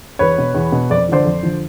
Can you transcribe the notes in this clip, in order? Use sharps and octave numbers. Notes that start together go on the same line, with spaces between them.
E2 B4 C#5
B2
E2
B2
F2 D5
D3 F3 C5 D5
F2
D3 F3